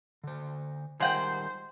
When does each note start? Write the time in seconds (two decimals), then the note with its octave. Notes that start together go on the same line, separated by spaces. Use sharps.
0.24 D3 C5
1.00 D#3 G3 G#3 A#4 C5 F#5 G5